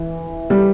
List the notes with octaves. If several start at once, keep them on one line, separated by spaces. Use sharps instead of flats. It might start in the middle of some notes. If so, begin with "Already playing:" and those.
Already playing: E3
G3